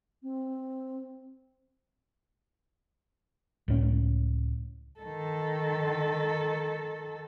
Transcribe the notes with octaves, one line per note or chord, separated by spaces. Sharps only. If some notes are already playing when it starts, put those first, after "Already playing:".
C4
C#2 A2 C#4
D#3 A4